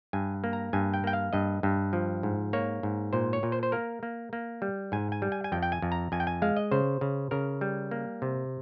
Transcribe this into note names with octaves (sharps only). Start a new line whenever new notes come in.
G2 G#5
A#3
A#5
G2 G#5
G5
A#3 G5
F5
G2 D#5
G2
F3
G#2
A#3 C#5
G#2
A#2 C5
C#5
A#2
C5
C5
A#3 A#4
A#3
A#3
G3
G#2 G#5
G#5
G3
G#5
G#5
F2 G5
G5
G#5
F2
A#5
F2 G#5
G5
G#5
G#3 F5
D#5
C#3 C5
C#3
C#3 A#4
G3
A#3
C3